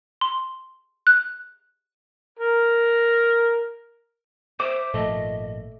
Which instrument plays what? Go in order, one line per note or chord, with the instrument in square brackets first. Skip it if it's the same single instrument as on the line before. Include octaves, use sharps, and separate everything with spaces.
[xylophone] C6
F#6
[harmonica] A#4
[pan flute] C5 [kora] E5 [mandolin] D6
[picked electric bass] G#1 A#2 F3 [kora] A3 [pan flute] D#5